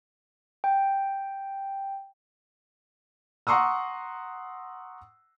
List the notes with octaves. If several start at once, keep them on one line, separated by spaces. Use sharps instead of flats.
G5
F#5 A#5 C6 C#6 D#6 E6